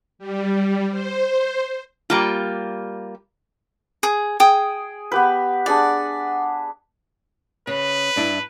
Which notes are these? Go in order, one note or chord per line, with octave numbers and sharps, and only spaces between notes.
G3
C5
G3 A#3 F4
G#4
G#4 G5 D#6
B3 G4 B4
D4 G#4 D5 F#5
C#3 B4
G2 D4 E4